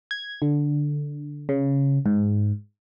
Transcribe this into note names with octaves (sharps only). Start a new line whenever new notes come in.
G#6
D3
C#3
G#2